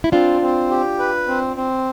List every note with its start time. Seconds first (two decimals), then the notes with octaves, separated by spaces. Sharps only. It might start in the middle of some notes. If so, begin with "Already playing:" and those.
0.04 E4
0.12 C4 D4 F4
0.42 C4
0.70 G4
0.99 B4
1.28 C4
1.57 C4